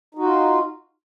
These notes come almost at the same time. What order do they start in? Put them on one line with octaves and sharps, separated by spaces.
D#4 F#4 F4